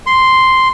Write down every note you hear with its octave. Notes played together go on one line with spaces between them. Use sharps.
C6